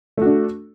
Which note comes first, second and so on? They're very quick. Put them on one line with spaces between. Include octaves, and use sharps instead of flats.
A3 F#4 D4